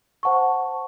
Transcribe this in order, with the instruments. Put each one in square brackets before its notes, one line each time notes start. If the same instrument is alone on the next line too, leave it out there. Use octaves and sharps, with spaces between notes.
[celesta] C5 F#5 A5 C#6